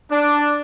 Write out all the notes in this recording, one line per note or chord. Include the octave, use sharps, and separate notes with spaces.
D4